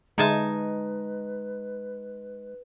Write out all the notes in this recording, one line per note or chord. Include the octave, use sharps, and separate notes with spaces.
D3 G#3 D#4 G#4 B4 E5 G#5 A5